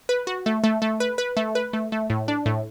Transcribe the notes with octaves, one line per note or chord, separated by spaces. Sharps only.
B4
F#4
A3
A3
A3
B4
B4
A3
B4
A3
A3
A2
D4
A2